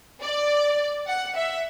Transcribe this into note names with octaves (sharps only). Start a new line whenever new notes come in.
D5
F#5
E5